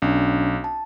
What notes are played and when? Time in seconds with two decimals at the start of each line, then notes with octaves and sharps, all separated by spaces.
0.02 B1 C#4 D4
0.64 A5